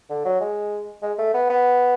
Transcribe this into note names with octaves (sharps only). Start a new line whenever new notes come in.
D3
F#3
G#3
G#3
A3
B3
B3